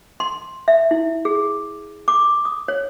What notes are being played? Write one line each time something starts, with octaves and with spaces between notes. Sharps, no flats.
C6
E5
E4
G#4
D6
D#6
C#5